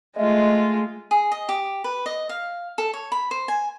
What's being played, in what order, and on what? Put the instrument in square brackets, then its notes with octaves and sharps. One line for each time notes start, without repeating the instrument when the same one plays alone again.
[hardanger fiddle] G#3 F4 [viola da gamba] A3 [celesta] D#5 E5
[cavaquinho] G#4
D#5
G4
B4
D#5
F5
A4
C#5
B5
C5
G#5